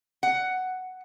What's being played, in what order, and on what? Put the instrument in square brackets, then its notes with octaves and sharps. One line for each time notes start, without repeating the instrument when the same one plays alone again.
[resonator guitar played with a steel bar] F#5